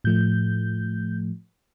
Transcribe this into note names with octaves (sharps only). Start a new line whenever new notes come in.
A2 F3 A3 G6